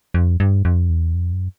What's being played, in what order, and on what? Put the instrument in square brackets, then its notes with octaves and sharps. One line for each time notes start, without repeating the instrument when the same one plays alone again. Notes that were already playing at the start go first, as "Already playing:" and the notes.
[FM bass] F2
G2
F2
E2
F2
F#2